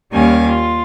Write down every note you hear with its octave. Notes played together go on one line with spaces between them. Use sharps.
D#2 D#3 G3 C#4 F5 G#5
F4